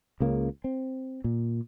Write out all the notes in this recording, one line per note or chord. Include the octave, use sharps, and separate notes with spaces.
C#2 C#3 A#3
C4
A#2